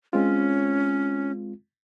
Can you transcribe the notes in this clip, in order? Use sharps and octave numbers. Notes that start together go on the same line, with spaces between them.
G#3 C4 C#4 F4